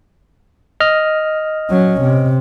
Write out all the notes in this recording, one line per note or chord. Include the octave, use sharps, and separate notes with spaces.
D#5 F6
F#3 C#4
C3